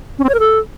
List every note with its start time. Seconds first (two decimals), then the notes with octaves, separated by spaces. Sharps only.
0.19 C#4
0.24 C4
0.29 C#5
0.34 A#4
0.39 A4